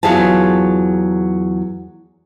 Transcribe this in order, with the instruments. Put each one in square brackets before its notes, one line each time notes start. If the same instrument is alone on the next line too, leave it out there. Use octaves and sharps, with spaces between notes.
[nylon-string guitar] E2 F#3 F4 G#4 B4 A5